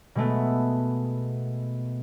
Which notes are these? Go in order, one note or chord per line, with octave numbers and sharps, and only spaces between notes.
B2 G#3 A3 B3